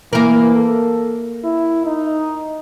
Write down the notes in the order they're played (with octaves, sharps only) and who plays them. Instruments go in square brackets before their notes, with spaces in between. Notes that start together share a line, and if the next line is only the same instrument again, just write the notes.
[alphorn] E3 [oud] A#3 A#4
[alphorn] A4
E4
D#4